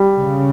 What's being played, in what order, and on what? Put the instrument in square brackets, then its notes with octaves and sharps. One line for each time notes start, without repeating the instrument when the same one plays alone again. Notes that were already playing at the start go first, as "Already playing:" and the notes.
Already playing: [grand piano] G3
[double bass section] C#3